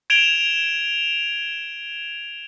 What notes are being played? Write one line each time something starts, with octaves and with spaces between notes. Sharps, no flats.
G#6 D7 E7 F7 G7